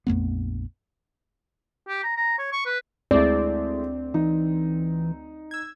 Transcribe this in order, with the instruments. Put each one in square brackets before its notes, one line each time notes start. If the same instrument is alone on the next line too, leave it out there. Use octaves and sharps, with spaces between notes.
[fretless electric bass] A#1 F2 A3 B3
[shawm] G4
A#5
A#5
C#5
C#6
B4
[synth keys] D2 C4 [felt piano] G#3 A3 E4 [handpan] D5
[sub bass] E3 [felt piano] D#4
[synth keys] E6 G#6